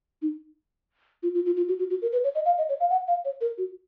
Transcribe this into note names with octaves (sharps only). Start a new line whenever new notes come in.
D#4
F4
F4
F4
F4
F#4
F#4
F#4
A#4
B4
C#5
D#5
F5
D#5
C#5
F5
F#5
F5
C#5
A#4
F#4